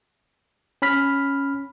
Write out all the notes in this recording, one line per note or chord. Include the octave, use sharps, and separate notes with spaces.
C#4 B5 F6 B6